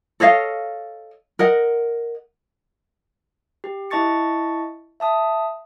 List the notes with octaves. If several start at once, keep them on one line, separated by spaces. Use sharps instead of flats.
A4 C#5 D#5 F5
A#4 D#5 F#5
G4
E4 D#5 A5 C#6 A6 C#7
E5 A5 D#6